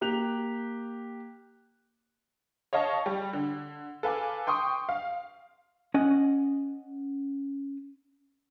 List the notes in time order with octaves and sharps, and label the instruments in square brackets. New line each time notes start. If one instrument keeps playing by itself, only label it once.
[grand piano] A#3 G4 F#6 F7
[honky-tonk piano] C#5 D#5 F5 A5 C#6
G3
D3
A4 B4 F5 G#5 D6
G5 C6 C#6 D#6
F5
[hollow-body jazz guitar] C#4 D#5 F#5